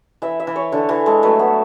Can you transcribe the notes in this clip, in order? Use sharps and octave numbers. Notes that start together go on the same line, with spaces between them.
E3 E5
E5
E3
C#5
D3 C#5
E3 A4
G#3 A4
F#3 A3 B4
B3